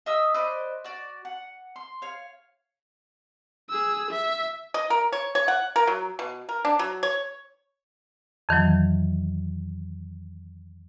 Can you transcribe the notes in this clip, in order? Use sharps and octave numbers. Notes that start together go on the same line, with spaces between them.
D#5 E5 D#6 E6
B4 C5 D5 D#5
F#4 D5
F#5
C6
C#5 F5
G#4 E6
E5
D#5
A#4
C#5
C#5
F#5
A#4
F#3
B2
A#4
D4
F#3
C#5
F2 D#3 E3 F#3